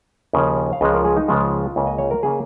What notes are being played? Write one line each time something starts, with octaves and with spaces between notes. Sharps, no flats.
D#2 C#3 F3 C#4
F5
C#2 C#3 F3 G#3 D#5
A#4
G#4
D#4
C#2 C#3 F3 G#3 F4
C#2 C#3 A#3 C#4
D#5
C#5
A#4
C#3 A#3 C#4 G#4